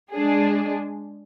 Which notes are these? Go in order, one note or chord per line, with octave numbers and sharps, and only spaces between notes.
G#3 D4 G#4